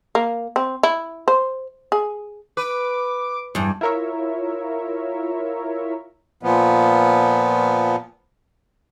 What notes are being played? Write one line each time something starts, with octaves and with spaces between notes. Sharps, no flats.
A#3
C4
E4
C5
G#4
B4 D6
E2 G2
E4 F4 A#4 C#5 E5
A#2 F3 B3